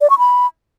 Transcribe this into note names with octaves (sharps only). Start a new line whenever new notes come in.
D5
C#6
B5